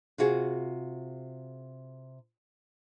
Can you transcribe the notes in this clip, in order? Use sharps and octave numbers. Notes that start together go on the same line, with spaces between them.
C3 F4 F#4 G#4